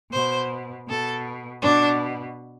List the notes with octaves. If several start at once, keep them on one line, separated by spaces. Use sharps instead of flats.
B2 C5
B2 A4
B2 D4